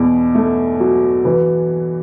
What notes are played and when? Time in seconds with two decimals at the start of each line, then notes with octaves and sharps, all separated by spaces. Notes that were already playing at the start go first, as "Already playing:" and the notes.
Already playing: E2 B2
0.35 A3
0.80 F#3
1.25 E3